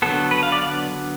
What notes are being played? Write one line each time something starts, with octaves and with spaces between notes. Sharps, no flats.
D3 F#3 B3 A4
B4
F5
D5